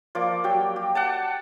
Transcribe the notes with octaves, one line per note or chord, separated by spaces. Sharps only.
F3 A#3 D5
F#3 G4 G5
G4
F#5 G5 A5